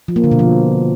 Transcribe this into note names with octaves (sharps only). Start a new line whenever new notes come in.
F3
A#3
D3
B2
F3